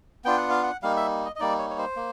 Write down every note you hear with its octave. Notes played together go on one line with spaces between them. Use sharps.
B3 D4 F4 G5
F#5
F5
F#5
G3 A#3 D#4 F5
E5
D#5
D#5
G3 A#3 D#4 D5
C#5
C#5
C5
A#3